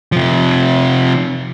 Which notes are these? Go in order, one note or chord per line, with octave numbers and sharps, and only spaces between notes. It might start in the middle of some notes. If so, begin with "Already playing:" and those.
C3 F3